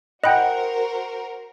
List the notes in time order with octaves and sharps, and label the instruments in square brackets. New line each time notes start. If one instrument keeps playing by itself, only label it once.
[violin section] F#4 A#4 C5 [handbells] D#5 G5 [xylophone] F#5 B5 F#6